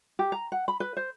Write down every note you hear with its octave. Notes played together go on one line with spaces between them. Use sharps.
G4
A#5
F#5
B5
B4
C5